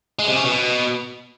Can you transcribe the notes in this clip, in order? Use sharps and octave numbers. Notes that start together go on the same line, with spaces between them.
G#3
C3
C#4
B2